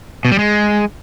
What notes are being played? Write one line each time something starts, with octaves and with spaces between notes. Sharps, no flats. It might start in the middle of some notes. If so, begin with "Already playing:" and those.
B2
G3
G#3